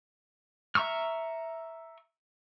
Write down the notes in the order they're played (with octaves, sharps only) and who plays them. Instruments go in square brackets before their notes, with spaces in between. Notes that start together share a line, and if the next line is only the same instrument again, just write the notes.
[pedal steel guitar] E5 A#5 C#6 E6 F6